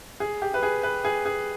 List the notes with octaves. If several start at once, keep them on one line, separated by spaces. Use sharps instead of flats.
G#4
G4
B4
G#4
B4
G#4
G#4